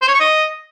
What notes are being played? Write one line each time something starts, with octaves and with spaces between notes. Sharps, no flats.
C5
C#5
C#6
D#5